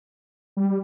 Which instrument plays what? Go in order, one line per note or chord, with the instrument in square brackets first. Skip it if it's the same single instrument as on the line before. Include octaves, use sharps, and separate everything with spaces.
[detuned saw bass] G3